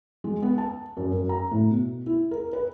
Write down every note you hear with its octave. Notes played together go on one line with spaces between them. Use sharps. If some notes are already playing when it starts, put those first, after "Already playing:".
G#3
B3
A5
F#2
F#2
A#5
A2
B2
E4
A#4
B4